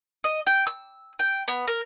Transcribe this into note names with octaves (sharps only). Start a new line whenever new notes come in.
D#5
G5
E6
G5
B3
A#4